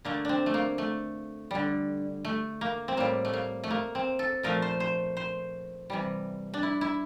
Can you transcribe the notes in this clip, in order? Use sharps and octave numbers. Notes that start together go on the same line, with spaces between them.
D3 A3 A#3
C4 D4
A3
A#3
A3
D3 G3
A3
A#3
C4
A2 G3 A#3
A3
A#3
A3
A#3
C4
A4
A#2 F3 A3 A#4
C5
C5
C5
C3 E3 G3
D4
E4
E4